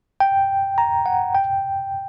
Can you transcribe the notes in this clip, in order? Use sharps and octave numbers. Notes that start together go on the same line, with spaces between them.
G5
A#5
F#5
G5